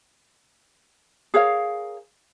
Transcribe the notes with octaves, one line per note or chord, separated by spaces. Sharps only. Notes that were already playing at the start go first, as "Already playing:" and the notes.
G#4 A#4 C#5 F5